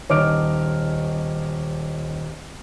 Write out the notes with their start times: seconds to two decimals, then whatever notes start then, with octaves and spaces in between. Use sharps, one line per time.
0.09 D#1 C#5 D#5 D6 F6 D7